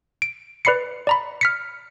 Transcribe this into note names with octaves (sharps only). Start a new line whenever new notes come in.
D7
B4 D5 B5 C7 C#7
D5 A#5 B5
F6 B6 C#7